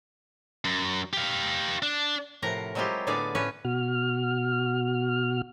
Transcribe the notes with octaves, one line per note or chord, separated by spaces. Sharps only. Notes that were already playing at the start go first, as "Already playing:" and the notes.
F#2
G4 F5
D4
A2 C3 F3 A#4 F#5 A#5
F#3 G#3 C4 E4 F4 G4
A2 D3 B3 G#4 D5 F5
A2 C#4 B4 C#5
B2 F#4 F6